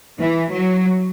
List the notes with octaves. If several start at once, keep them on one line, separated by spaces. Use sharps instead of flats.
E3
F#3